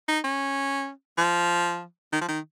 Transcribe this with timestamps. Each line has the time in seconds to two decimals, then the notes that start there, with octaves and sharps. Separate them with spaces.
0.08 D#4
0.24 C#4
1.18 F3
2.13 D#3
2.21 F3
2.28 D#3